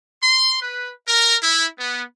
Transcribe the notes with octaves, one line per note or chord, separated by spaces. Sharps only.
C6
B4
A#4
E4
B3